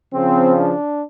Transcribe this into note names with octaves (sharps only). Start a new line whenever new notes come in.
C#3 F3 C4
D4